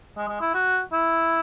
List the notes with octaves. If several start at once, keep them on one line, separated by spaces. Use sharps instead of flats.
G#3
G#3
E4
F#4
E4